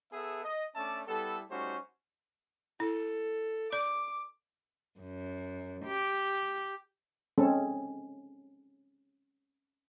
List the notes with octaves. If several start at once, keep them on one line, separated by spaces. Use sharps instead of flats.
B3 G#4 A4 E5
D#5
A3 C#4 D4 D5 E5 A5
G3 B3 E4 A4
G3 A3 C#4 D#4 F#4 C5
E4 A4
D5 D6
F#2
G4
G#3 C4 C#4 A4